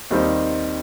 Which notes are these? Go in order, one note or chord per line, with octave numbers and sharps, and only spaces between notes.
D#2 D#3 G3 C4 D#4